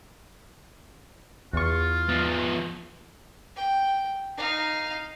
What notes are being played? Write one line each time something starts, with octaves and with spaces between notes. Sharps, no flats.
E2 F4 C#6
F3 B3
G5
D#4 F5